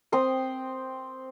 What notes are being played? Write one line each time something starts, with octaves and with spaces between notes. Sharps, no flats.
C4 G5 C6 D#6